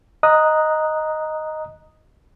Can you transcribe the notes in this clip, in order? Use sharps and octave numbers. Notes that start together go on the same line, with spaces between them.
D#5 A#5 D#6 F#6